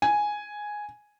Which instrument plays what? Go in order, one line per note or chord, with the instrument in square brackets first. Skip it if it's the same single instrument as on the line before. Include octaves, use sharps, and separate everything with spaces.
[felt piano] G#5